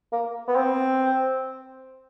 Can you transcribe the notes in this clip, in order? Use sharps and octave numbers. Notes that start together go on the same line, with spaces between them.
A#3
B3
C4